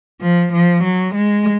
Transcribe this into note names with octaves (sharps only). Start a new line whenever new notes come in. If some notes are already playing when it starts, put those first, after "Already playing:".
F3
F3
F#3
G#3